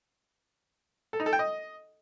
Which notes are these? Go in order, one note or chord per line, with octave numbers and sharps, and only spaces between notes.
A4
D#4
A4
G5
D#5